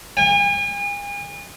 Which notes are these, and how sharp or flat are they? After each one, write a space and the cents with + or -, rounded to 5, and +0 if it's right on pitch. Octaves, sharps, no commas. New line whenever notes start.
G#5 -40